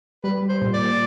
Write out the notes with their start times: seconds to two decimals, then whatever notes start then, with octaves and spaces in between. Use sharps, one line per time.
0.24 G3 B4
0.49 C5
0.61 A#2
0.74 D5